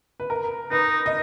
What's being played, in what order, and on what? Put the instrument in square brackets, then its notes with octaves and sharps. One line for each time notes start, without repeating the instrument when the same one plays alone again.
[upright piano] B4
A#4
[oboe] D#4 [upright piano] B4
[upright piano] D#5